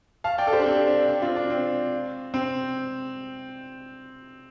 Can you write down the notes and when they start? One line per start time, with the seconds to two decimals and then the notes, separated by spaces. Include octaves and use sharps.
0.24 F5 A5
0.38 D5 G5
0.47 A4
0.52 G4 C5
0.59 D4
0.66 C4
0.87 D4
1.09 D4
1.22 C4 F4
1.36 D4
1.50 C4
2.34 C4